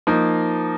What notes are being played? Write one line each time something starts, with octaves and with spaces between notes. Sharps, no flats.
F3 A#3 D#4